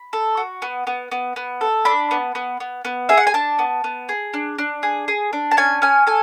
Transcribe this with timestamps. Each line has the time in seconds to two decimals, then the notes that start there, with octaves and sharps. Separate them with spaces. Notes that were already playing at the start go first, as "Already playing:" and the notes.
Already playing: B5
0.13 A4
0.37 F#4
0.62 B3
0.87 B3
1.11 B3
1.36 B3
1.61 A4
1.85 D4 B5
2.11 B3
2.35 B3
2.60 B3
2.85 B3
3.09 G#4 E5
3.17 F#5
3.27 G#5
3.34 D4 A5
3.59 B3
3.84 B3
4.09 G#4
4.34 D4
4.59 D4
4.83 G#4
5.08 G#4
5.33 D4
5.51 A5
5.57 C#4 G#5
5.82 C#4 G#5
6.07 A4 G#5